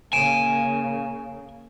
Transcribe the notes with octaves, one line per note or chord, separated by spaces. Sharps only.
C#3 A#3 G#5 D7 E7